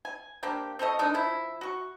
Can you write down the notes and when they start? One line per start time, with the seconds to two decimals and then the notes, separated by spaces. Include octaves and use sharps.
0.05 G#5
0.43 A#3 C4 D4 G4
0.79 C4 C#4 A4 D#5
0.99 D#3 G#3 D4 D#4
1.14 F3 E4
1.61 F#4 C#6